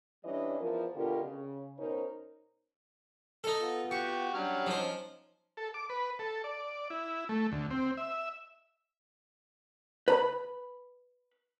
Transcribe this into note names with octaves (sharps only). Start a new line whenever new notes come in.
E3 G3 C#4 D4 D#5
E2 E3 F3 A#4
B2 D3 F4 G4 A#4
C#3
B2 C#4 D#4 A#4 C5
D#4 A4
B3 F4
F#4 G4 C#6
F#3 G3 C#4 D4 F#5 F6
F3 C#4 D#4 C5
A4
D6
B4
A4
D5
E4
A3
D2
C4
E5
B4 A#5 B5